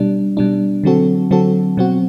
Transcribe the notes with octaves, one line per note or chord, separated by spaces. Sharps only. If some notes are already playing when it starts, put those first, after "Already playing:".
Already playing: B2 G3 D4
B2 G3 D4
D3 F#3 C4 F#4 A4
D3 F#3 C4 F#4 A4
B2 F#3 C4 F#4